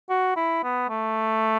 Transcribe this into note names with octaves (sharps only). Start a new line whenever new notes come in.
F#4
E4
B3
A3